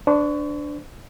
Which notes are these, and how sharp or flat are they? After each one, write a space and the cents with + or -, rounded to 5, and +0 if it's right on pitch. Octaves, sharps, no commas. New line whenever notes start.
D4 +0 C5 -40 C#6 +25